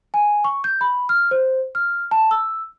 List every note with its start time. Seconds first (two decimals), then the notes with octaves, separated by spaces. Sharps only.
0.14 G#5
0.44 C#6
0.64 G6
0.81 B5
1.09 F6
1.31 C5
1.75 F6
2.11 A5
2.31 E6